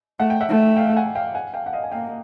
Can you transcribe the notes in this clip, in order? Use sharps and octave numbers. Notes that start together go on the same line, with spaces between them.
A3 F#5
G5
E5 F#5
A3
F5 G5
F#5 G#5
F5 G5
F#5 G#5
F5 G5
F#5
D#5 F5
G#5
A#3 F5 G5